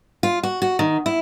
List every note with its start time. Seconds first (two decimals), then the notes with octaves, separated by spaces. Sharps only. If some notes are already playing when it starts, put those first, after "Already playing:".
0.23 F4
0.43 F#4
0.62 F#4
0.79 D#3
1.06 E4